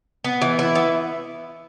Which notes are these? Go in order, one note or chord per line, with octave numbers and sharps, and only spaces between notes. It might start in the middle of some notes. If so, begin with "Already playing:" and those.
B3
E3
E4
B3